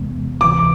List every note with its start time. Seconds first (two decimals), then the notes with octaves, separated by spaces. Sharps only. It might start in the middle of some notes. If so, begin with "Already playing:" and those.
Already playing: E2 C3 E3 G#3 B3
0.41 D2 C3 E3 D6